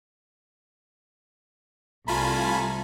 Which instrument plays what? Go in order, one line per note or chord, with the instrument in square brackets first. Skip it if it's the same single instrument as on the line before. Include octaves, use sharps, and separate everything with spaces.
[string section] C2 [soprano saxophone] A3 [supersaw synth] F4 G#5 B5 [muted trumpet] A#5